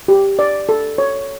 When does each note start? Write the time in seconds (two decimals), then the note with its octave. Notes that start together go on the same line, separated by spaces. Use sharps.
0.08 G4
0.39 D5
0.69 A4
0.98 C#5